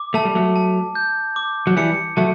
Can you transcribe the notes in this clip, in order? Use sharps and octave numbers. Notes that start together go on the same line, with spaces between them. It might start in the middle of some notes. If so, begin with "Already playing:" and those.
Already playing: D6
A3 A5
G3
F#3 A3
A5
G6
D6
F#3
E3 G3 C#7
F#3 A3 A5